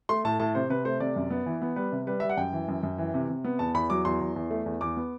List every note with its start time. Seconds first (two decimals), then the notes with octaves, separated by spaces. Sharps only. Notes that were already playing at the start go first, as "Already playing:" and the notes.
0.09 A3 C6
0.25 A2 A5
0.40 A2 A5
0.55 C3 C5
0.70 C3 B4
0.85 A3 C5
1.00 C3 D5
1.16 F#2
1.30 B3
1.46 E3
1.62 B3
1.76 G3 B4
1.92 C3
2.07 G3 B4
2.20 G3 E5
2.30 F#5
2.37 F#2 G5
2.53 E3
2.68 F#2
2.83 F#2
2.98 E3
3.14 C3
3.29 C3
3.44 B3
3.59 E2 A5
3.74 E2 B5
3.90 F#3 D6
4.05 E2 C6
4.21 E2
4.36 E2
4.51 A3
4.66 E2
4.81 E2 D6
4.97 B3